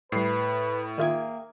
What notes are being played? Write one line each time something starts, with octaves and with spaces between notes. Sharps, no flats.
A2 G3 B4 C7
D#3 A#3 F4 G#4 E5 G5 G#6